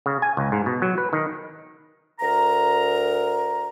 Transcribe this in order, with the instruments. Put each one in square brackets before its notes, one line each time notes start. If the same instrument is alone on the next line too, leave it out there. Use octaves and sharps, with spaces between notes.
[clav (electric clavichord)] C#3
G#5
C#2
G#2
B2
F#3
B4
D#3
[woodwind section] D2 A#4 A#5